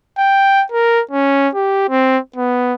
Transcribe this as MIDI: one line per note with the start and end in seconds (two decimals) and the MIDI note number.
0.18 0.64 79
0.72 1.01 70
1.11 1.48 61
1.55 1.87 67
1.90 2.18 60
2.36 2.74 59